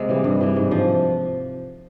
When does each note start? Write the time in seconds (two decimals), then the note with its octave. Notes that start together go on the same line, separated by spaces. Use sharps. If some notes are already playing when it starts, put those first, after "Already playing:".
Already playing: C3 G#3 A#3
0.09 E3 G3
0.24 G2
0.41 E3 G3
0.56 G#2
0.71 F3